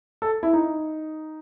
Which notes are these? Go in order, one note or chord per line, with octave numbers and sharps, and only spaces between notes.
A4
E4
D#4